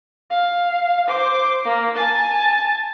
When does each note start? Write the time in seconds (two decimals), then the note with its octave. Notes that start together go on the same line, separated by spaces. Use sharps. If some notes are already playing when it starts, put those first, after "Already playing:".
0.31 F5
1.08 C5 D6
1.65 A#3
1.95 G#5 A5